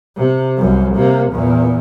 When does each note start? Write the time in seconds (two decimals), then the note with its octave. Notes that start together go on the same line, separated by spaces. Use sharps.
0.17 C3
0.57 C2 F#2
0.94 C3 A#3
1.32 E2 A#2